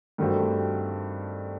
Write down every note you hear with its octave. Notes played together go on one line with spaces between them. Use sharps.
G2 D#3 A3 C4 F#4